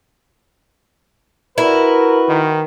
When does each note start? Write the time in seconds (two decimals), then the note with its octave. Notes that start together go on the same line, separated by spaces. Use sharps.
1.58 E4 F#4 A#4 B4
2.28 D#3